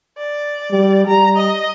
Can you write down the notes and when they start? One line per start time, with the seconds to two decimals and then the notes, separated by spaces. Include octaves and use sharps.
0.18 D5
0.71 G3
1.07 G3 A#5
1.37 D#5